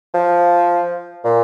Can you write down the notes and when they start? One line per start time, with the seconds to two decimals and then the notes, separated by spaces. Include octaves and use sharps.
0.14 F3
1.24 A#2